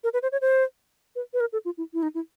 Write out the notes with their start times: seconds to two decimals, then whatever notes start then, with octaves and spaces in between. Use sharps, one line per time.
0.04 A#4
0.13 B4
0.22 C5
0.32 C#5
0.41 C5
1.16 B4
1.33 B4
1.40 A#4
1.53 A4
1.65 F4
1.78 E4
1.94 E4
2.03 D#4
2.15 E4